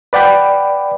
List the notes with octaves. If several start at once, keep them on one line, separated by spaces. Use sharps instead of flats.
B4 D5 F#5 G5 B5 D6